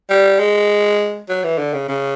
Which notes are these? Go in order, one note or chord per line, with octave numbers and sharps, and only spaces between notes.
G3
G#3
F#3
E3
D3
C#3
C#3